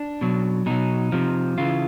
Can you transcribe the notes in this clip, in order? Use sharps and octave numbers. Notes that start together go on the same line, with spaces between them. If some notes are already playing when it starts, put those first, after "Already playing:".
Already playing: D4
B2 F#3
B2 F#3 D#4
C3 F3
C#3 E3 F4